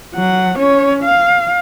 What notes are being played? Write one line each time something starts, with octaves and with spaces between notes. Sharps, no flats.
F#3 F#5
C#4 C#5
F5